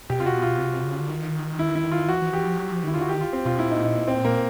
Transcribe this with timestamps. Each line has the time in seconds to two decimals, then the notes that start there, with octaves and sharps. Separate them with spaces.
0.10 B2 G4
0.20 C3 F4
0.26 B2 F#4
0.42 F4
0.59 C3
0.84 C#3
1.00 D3
1.09 D#3
1.59 E4
1.75 E4
1.92 F4
2.08 E3 F#4
2.22 E3
2.33 E3 G4
2.46 F3
2.58 F#3
2.71 F3
2.83 D#3 E4
2.94 D3 F4
3.01 F#4
3.09 D#3 G4
3.21 F4
3.33 C4
3.45 B2 F4
3.59 A#2 E4
3.71 D#4
3.84 D#4
4.08 C4
4.25 A#3